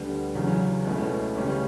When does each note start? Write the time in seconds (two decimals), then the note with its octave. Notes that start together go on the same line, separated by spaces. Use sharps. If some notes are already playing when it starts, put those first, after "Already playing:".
Already playing: D2 D3 G3 B3
0.35 E2 C#3 F#3 C#4
0.85 C#2 B2 A3 C#4 E4
1.36 C#3 G3 C#4 G4